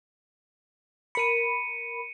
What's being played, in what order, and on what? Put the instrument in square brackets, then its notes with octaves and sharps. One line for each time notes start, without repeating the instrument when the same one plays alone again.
[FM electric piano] A#4 B5 [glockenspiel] C#7 D#7